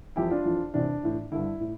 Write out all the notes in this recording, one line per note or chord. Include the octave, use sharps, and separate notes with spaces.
F2 E3 E4 G4
D4 F4
F2 E3
E2 C3 E3 D4
A2 E3
G2 D3 E4
A2